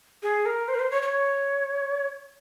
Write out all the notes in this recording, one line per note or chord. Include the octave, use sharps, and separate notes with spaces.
G#4
A#4
C5
A#4
C5
C#5
C#5